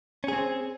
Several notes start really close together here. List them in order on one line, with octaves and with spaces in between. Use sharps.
C#4 G#4 C4